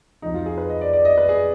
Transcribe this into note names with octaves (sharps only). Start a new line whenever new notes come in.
F2 F3 D#4
F4
G#4
B4
D#5
D5
D5
D#5
B4
G#4